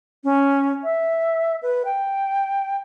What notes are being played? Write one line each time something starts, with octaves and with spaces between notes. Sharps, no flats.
C#4
E5
B4
G5